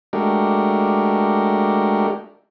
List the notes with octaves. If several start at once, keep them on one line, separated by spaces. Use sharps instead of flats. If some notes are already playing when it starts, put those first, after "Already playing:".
G#3 A3 D4 F#4 G4 A#4